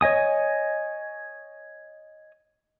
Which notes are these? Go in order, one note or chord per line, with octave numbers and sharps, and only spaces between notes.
C#5 D#5 G#5 D#6